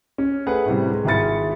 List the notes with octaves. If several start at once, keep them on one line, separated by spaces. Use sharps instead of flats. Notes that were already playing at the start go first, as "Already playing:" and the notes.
C#4
A3 G#4 B4 F#5
A2 C3 G3
G#3
G#1 E4 G#4 B5 A6 C#7